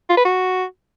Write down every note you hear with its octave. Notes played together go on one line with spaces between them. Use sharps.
F4
B4
F#4